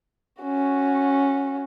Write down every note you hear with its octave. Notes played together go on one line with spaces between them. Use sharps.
C#4 F#4